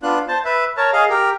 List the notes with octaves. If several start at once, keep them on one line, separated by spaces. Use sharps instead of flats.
B3 D4 F4 F#6
C5 A5
B4 E5
A#4 C#5 A5
G#4 D#5 F5
G4 A#4